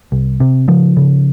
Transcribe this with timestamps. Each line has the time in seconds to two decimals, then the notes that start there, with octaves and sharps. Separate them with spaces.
0.12 C2
0.40 C3
0.68 C#3 F3
0.97 C#3